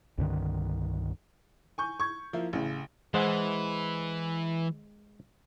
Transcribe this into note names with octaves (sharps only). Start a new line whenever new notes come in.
C2 G2 D3 D#3
G#5 C#6 G6
C#6 G#6
F3 A#3 E4
A1 C#3
E3 G#3 C5 F#5